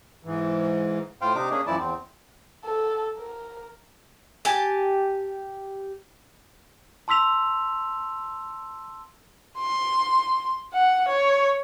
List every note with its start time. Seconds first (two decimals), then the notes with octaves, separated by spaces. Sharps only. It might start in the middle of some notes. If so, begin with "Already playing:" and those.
0.24 G#2 E3
1.21 A2 F4 C5 F5 G5
1.35 C3 D4 D#4 D6
1.51 A#3 C#4 D4 G#4
1.67 F#2 E3 F3 E4 D5 A5
1.79 E2 C4
2.65 A4
3.18 A#4
4.45 G4 G#5 A5
7.08 A5 C6 E6 B6 F7
9.59 C6
10.74 F#5
11.08 C#5